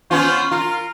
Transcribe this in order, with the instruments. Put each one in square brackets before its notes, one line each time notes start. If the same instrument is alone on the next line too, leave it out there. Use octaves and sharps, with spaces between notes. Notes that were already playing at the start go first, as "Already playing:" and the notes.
[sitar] B3 C#4 F4 [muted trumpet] C5
[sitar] F4 [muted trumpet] A#4